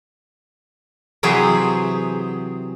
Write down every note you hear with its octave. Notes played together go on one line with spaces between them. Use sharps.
C3 E3 F#3 G#4 C5